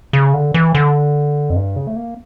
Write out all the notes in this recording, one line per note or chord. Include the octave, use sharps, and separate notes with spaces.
C#3
D3
E3
D3
F2
G2
C#3
A3
A#3